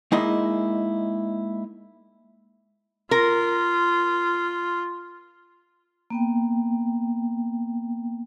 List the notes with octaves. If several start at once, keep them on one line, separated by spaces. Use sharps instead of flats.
G#3 A#3 D#4 E4 D#5
F4 A#4
A#3 B3 G5